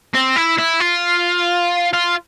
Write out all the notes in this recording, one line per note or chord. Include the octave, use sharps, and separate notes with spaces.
C4
E4
E4
F4
F4